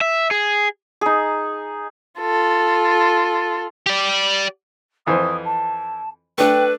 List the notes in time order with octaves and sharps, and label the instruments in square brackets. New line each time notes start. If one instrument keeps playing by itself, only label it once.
[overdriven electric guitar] E5
G#4
[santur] D#4 G#4
[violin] F4 A4
[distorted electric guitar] G4 D5
[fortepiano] F2 E3 C5 [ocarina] D#6
[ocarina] A5
[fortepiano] A3 D4 A4 [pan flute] B4 [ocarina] G5